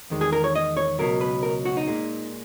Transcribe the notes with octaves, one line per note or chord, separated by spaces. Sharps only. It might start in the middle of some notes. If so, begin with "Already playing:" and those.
E2 D#3 G#3
G#4
A#4
C#5
D#5
C#5
C#2 B2 F#3 A#4
B4
A#4
F#4
D#4
A#2 G#3